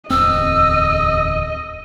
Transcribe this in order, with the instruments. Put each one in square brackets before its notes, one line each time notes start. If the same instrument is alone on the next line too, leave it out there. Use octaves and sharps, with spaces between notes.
[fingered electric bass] D1 E2 C4 [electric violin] D#5 [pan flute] E6